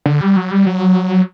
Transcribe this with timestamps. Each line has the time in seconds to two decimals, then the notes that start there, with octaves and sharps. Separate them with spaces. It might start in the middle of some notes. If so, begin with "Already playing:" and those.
0.06 D3
0.21 G3
0.36 F#3
0.51 G3
0.66 F#3